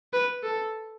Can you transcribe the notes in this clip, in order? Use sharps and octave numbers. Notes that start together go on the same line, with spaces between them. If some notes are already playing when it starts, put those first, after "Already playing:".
B4
A4